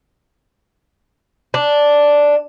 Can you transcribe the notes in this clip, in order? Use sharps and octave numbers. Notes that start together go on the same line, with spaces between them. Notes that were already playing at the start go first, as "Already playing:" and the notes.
D4